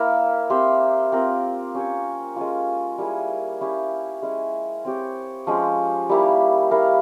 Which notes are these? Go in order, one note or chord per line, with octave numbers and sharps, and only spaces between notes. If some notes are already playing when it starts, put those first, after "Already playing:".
Already playing: A#3 E4 A#4 E5
C4 G4 C5 E5
C4 F4 A#4
C#4 G4 C#5
G#3 C#4 F4
G3 A#3 E4 G#4
C#4 E4 G4
G#3 C#4 E4
C4 G4 C#5
F3 G#3 C#4 G4
G3 A#3 E4 G4
E4 A#4 F5